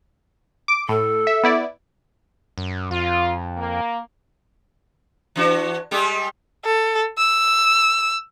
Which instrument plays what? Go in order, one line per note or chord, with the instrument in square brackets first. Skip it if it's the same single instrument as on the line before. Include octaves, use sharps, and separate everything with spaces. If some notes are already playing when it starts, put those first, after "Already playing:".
[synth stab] D6
[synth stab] A2 [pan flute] A4
[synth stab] E5
B3 E4 D5
[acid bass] F#2
[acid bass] F2 [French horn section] F4
[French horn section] A#3
[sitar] E3 D4 F#4
G3 G#3 G4
[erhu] A4
E6